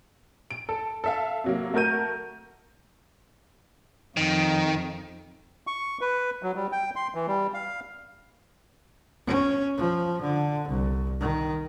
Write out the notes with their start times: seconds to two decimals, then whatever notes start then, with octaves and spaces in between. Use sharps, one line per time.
0.51 D7
0.69 A4
1.04 A4 E5 F5
1.44 C3 F#3 A#3
1.74 A3 F#4 A#4 G6 D#7
4.17 F2 D#3
5.67 C#6
6.01 B4
6.43 F#3
6.55 G3
6.72 G5
6.96 C6
7.14 E3
7.27 G3
7.54 F5
9.27 C#4
9.78 F3
10.22 D3
10.69 C2
11.20 D#3